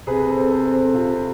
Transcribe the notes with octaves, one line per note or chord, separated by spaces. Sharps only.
C3 G#4 B4
A4 C5
C4
A4 C5
C4
A4 C5
C3 F4